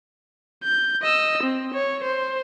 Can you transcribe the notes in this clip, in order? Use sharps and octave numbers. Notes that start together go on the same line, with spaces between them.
G6
D#5 E6
C4
C#5
C5